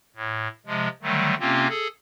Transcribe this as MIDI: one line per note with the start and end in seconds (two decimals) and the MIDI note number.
0.16 0.48 45
0.66 0.88 48
0.66 0.88 53
0.66 0.88 56
1.02 1.35 50
1.02 1.35 51
1.02 1.35 54
1.02 1.35 55
1.02 1.35 57
1.40 1.67 48
1.40 1.67 58
1.40 1.67 60
1.40 1.67 61
1.40 1.67 65
1.69 1.88 68
1.69 1.88 69